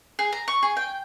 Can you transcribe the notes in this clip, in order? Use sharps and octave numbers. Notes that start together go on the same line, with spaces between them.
G#4
A#5
C#6
G#4
G5